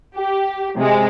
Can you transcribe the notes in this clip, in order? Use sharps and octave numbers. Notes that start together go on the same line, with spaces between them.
G4
C3 G#3